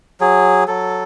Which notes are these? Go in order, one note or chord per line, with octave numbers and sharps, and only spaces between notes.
F#3 G#4
F#3 A4